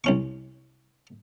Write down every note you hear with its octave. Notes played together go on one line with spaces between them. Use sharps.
C2 C#4 C#6